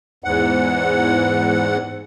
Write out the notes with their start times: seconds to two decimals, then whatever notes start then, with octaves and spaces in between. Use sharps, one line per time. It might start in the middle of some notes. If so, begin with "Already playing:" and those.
0.24 E2 G#2 F#5